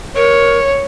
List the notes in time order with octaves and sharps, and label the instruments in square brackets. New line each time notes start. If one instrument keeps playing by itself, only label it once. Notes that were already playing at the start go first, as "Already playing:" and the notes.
[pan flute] A#4 [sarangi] C#5